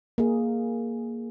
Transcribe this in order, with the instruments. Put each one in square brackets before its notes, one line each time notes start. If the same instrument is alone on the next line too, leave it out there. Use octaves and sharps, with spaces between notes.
[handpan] A#3 G#4